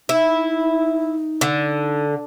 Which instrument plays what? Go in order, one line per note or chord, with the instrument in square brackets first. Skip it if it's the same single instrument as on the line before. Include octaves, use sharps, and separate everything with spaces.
[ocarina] D#4 [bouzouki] E4
[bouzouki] D3